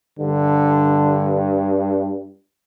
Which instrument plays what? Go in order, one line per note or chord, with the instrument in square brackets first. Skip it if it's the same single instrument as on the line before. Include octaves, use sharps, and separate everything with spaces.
[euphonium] G2 [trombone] D3